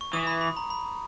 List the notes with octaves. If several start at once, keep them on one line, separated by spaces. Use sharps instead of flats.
C#6
E3 D#6
B5
B5
A#5
B5